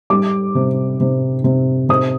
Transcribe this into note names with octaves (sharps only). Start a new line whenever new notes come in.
G3 D6
C3
C3
C3
C3 D#6